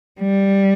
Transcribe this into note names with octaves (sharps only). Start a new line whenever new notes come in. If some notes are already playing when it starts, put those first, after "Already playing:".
G3